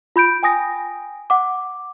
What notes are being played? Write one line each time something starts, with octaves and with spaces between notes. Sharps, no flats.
F4 B5 G6 D7
G5 G#5 D#6 A#6
F#5 D6